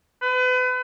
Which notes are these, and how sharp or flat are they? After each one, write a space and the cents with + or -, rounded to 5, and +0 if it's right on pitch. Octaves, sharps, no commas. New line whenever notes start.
B4 +35